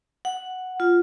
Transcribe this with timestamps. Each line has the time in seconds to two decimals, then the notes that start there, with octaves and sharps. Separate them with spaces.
0.25 F#5
0.80 F4